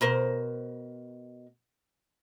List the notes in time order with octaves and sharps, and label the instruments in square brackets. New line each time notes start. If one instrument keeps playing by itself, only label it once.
[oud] B2 A#4 C5